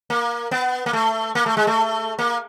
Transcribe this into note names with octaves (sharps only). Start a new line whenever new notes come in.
A#3
B3
A#3
A3
A#3
A3
G#3
A3
A#3